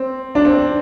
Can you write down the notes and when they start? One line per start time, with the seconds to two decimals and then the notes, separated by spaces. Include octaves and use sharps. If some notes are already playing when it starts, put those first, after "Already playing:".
Already playing: C4
0.35 D4
0.45 C4